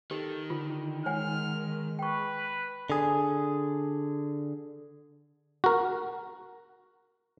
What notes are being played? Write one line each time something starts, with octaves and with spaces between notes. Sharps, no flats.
D#3 G4 A4
D3 F4
G#3 C#5 F#5 G#5 F6
B4 G5 C#6
D3 G#4
F#4 A#4